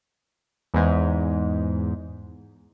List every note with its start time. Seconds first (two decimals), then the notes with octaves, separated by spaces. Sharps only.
0.74 E2 G#2